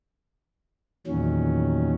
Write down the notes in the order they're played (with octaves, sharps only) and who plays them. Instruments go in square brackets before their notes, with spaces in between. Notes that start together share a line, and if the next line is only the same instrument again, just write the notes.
[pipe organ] E2 A#2 D#3 F#3 C#4